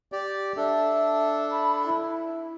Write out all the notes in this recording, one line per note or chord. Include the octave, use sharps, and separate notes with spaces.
G4 D5
D4 A4 E5
B5
E4